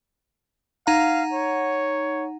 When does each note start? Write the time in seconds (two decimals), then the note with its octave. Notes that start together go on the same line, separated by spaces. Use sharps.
0.87 D#4 F5 F#5 A#5
1.33 C#5